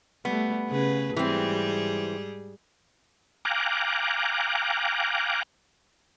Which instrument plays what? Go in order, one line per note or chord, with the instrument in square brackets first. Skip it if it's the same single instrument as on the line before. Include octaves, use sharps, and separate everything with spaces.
[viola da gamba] G3 A3 [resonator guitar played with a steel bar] B3
[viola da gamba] C#3 G#4 B4
[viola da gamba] G#2 G3 G#4 [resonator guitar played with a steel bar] E3 C4
[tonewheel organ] F5 G5 G#5 A#5 D6 F#6